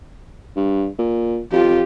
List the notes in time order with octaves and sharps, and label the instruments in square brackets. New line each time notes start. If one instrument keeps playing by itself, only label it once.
[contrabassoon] G2
A#2
[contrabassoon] F2 [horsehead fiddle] F4 G4